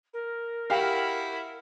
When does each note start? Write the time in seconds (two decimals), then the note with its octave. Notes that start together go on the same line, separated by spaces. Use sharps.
0.13 A#4
0.70 E4 F#4 G4 F5